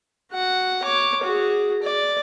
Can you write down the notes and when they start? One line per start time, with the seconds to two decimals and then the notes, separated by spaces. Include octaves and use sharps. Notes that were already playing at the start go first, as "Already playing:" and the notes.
0.33 F#4 F#5
0.83 C#5 D6
1.24 F#4 G#4
1.83 D5